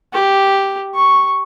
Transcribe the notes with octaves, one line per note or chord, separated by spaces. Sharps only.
G4
C#6